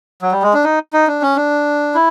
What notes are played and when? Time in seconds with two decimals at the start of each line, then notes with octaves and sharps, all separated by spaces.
0.22 F#3
0.32 G3
0.43 G#3
0.54 D4
0.64 D#4
0.93 D#4
1.08 D4
1.22 C#4
1.36 D4
1.95 E4